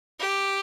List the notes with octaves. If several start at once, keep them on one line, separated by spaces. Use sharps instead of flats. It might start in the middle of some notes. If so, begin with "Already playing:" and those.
G4